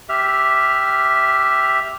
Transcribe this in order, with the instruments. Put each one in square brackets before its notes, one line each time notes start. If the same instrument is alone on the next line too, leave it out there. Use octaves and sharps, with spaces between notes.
[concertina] G4 E5 F6